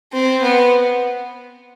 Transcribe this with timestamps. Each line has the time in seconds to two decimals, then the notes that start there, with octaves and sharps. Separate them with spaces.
0.13 C4
0.42 B3